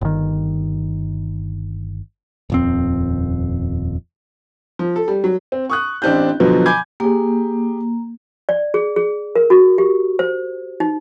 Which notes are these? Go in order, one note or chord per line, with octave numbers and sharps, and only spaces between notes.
G1 D#3
D#1 F2 C4
F3
A4
G3
F#3
C4
C#6 D#6 F#6
A1 C4 D4 G4 G6
B2 D3 F3 F#3 B3
G#5 B5 D6 G6 G#6
A#3 G4 G#4
D5
G#4
G#4
A#4
F#4
G4
C5
D#4